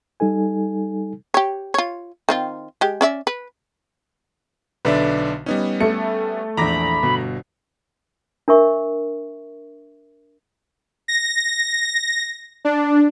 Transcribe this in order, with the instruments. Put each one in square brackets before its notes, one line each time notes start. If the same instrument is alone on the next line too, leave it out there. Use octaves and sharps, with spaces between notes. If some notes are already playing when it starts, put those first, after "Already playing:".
[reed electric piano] G3 D#4 A4 G#5
[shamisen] G4 C#5
F4 C#5
D#3 C4 F4
G#3 G4
C#4 D5 E5
B4
[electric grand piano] B1 D3 D4 [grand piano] B4 D5 E5
[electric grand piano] G3 B3 C#4 [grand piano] D#4
[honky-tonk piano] A3 [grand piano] C#7
[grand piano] A#1 E2 [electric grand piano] A#5 D6 A#6 [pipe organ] B5
[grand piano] G1 B2
[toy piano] D4 A#4 E5 C#6
[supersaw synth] A#6
D4